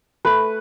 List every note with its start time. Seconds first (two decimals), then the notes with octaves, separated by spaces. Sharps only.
0.25 A3 B4